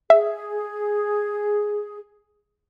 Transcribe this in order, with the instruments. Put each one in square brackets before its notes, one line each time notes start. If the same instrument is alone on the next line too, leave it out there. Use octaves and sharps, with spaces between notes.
[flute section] G#4 [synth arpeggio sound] E5